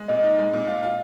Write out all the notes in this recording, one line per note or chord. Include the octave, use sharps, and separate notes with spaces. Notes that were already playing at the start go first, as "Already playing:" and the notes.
Already playing: G#3
A#2 D#5
D#4
G#3
A#2
F4
F4